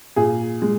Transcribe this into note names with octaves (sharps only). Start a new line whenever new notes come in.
A#2 G#4
G#3